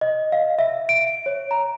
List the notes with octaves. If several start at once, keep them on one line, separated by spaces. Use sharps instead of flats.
D#5
F5
E5
D7
C#5
A#5